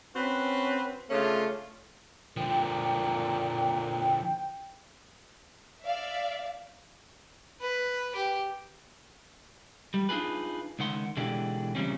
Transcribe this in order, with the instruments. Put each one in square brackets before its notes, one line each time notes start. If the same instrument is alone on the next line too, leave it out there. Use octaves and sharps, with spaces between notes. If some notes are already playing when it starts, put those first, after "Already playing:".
[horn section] C4 C#4 F#4 B4
C#3 A3 C#4 D4 F4
[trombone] A#2 [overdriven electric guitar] D3 F3 [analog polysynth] G5
[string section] D5 E5 F5
[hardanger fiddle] B4
G4
[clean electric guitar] G3
D4 D#4 F4 G#4 B4
C#2 D#3 F#5 C6
B2 D3 E3 G#3 D4 G4
E2 A#2 C#3 G3 C4 C#4